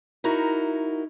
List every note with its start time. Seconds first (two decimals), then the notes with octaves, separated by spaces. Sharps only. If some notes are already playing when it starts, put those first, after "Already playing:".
0.24 D#4 E4 F#4 A#4